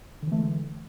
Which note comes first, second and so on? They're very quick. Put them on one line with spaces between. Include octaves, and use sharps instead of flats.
D3 E3 A3 G#3